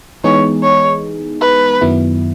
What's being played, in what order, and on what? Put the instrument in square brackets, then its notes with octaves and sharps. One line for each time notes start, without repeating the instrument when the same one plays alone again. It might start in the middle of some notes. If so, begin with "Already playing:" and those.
[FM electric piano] E3 G#3 B3 D#4 G#4 [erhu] C#5
[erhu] C#5
B4
[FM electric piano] F#2 D#3 F#3 B3 E4